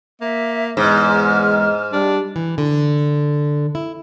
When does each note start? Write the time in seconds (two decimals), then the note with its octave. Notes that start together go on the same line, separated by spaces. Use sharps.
0.21 A#3 E5
0.77 E2 G#2 G#3 F6
1.93 G3 D4
2.36 E3
2.58 D3
3.75 E4